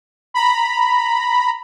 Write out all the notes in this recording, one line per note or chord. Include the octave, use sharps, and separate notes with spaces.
A#5 B5